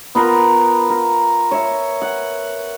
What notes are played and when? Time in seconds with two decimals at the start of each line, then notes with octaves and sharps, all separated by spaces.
0.15 B3 F4 A#4 B4
0.90 A#4
1.51 C#5 E5
2.02 F#5